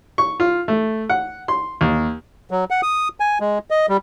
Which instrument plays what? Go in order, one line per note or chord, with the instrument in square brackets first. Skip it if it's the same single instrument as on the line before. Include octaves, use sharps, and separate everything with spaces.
[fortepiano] C#6
F4
A3
F#5
C6
D#2
[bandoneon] F#3
F#5
D#6
G#5
G#3
D#5
G3